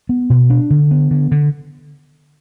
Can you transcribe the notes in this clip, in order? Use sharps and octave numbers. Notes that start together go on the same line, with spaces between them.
B3
B2
D4
D3
B3
D3
D3